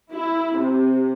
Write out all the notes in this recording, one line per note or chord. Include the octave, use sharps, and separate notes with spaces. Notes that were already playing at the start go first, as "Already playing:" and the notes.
E4
C3